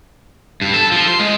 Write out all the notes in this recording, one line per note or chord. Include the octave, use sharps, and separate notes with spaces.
G2
A4
F3
C6
G#3